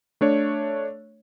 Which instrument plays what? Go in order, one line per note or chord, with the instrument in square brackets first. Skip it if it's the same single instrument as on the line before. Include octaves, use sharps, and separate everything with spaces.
[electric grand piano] A3 D4 C#5